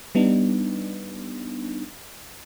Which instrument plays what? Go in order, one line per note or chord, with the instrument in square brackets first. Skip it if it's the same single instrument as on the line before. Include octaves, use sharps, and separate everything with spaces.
[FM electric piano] G3 B3 D4 D#4